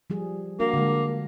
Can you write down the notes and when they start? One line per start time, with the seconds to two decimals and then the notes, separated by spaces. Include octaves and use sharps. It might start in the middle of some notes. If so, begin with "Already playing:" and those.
0.10 F3 G3 G#4
0.60 A#3 D4 F#4 A#4
0.74 D3 G#3